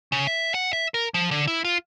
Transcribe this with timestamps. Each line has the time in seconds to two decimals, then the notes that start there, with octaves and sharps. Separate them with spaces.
0.12 C#3
0.27 E5
0.54 F#5
0.73 E5
0.94 A#4
1.14 F3
1.31 D3
1.47 E4
1.64 F4